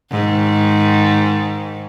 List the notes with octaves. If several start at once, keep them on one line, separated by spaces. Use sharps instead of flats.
G#2 D#3